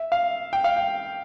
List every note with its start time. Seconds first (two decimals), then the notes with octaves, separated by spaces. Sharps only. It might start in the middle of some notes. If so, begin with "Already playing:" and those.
Already playing: E5
0.12 F5
0.53 G5
0.64 F5
0.76 G5